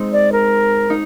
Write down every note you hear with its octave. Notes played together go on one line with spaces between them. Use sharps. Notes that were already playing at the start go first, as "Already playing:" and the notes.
Already playing: G#3 C4 D#4
D5
A#4
D#4